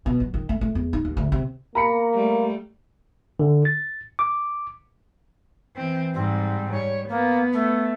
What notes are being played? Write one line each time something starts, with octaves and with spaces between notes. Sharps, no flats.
B2
F#3
D#3
A3
A3
E2
D#4
D#2
D2
C3
A#3 A#5 B5 C#7
G3 A3
D3
A6
D6
E3 C4
G#2 G3 C4
G3 C#5
A#3 B3
A3